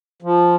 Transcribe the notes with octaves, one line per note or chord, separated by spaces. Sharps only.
F3